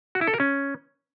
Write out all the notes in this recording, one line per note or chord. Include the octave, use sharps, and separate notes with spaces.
F#4
E4
A4
A#4
C#4